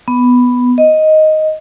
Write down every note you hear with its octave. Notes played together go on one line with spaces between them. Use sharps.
B3
D#5